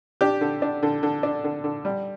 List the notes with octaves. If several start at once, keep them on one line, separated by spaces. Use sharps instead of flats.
D4 G4
D3
D4
D3
D3
D4
D3
D3
G3